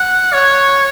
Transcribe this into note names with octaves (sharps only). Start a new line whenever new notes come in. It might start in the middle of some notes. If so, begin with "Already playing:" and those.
Already playing: F#5
C#5